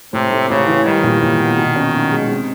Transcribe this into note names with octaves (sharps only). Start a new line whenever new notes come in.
A2 C3
A3
A1 C#3
E3
D#3 G3
A#2
A#2
B3
B2
C#4
B1
G#3
C3